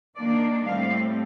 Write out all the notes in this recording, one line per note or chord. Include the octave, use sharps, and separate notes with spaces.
D#3 A#3 D4 D5
A2 G3 C4 F5